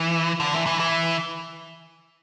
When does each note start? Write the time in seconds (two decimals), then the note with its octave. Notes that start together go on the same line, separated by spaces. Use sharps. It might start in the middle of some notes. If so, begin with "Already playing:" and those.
Already playing: E3
0.40 D3
0.54 E3
0.66 E3
0.80 E3